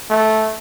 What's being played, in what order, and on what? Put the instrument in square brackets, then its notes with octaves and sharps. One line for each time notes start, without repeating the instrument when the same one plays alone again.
[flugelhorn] A3